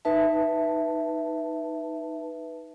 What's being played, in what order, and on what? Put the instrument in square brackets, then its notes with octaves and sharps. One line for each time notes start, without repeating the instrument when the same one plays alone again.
[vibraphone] D#4 B4 E5 A5